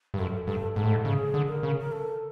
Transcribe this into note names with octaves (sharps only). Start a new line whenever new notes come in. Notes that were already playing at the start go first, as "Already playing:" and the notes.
G2
F#2 A4
G2 A4
G#2 A4
A2
G#2
C#3 G#4
D3
A#4
C#3
A#4
A4